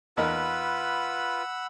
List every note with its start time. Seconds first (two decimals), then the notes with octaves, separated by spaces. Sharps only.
0.17 E2 D#4 F4 A#4 B4 F#5 B5 E6